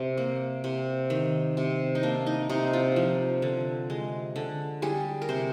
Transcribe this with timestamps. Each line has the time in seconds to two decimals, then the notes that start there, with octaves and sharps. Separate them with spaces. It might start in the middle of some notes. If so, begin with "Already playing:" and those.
Already playing: C3
0.17 A#3
0.64 C3
1.10 D#3
1.57 C3
1.95 D#4
2.03 A#3 D4
2.26 D#4
2.49 C3 D#4
2.73 F4
2.96 F3
3.42 D3
3.90 G#3
4.36 D3
4.82 G3 G#4
5.22 A#4
5.29 C3 C5